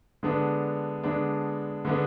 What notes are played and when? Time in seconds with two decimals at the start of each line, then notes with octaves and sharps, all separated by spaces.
0.23 D3 G#3 B3 D4
1.03 D3 G#3 B3 D4
1.85 D3 G#3 B3 D4